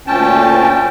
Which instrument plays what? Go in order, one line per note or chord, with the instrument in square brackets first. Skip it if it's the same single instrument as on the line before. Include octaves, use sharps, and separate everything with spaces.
[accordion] D2 A#2 C#4 G5 A5